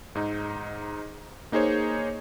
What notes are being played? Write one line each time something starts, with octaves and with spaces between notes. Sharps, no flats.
G#2 D#4
A#3 D#4 G#4 C5 C#5